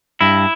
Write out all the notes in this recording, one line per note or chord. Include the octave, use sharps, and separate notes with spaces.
G2 E4